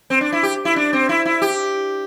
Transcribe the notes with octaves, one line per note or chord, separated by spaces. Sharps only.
C4
D4
E4
G4
E4
D4
C4
E4
E4
G4